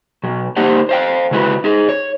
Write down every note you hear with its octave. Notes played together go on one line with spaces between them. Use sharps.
B2 F#3
A#3 D#4 G4 C5 F#5
C5 F5 G5
C#3 G#3 E4 F#4 B4
D#4 G#4
C#5